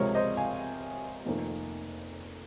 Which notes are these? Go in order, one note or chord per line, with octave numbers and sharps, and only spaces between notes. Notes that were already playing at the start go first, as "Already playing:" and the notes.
Already playing: C#2 C3 F3 G#3 A#4 C#5
C5 D#5
F5 G#5
F1 F2 D#3 A#3